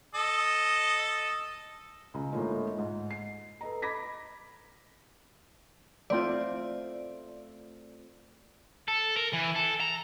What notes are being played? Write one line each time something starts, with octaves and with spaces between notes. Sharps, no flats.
A4 D#5
C#2 A#5
A2 D3 G#3 A#3 D#4 F4
G#2
C7
A4 B4 D#5 A#5
B5 D6 G#6 A#6 B6
A3 C4 F4 D5
A4
A#4
E3
A4
A#5